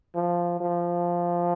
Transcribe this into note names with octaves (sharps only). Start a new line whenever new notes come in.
F3
F3